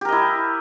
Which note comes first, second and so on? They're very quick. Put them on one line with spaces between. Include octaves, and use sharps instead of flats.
G4 A#4 D#5 E4